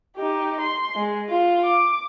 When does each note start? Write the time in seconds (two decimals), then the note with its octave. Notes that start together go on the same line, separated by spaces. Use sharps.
0.16 D#4 G4
0.61 C6
0.95 G#3
1.30 F4
1.64 D6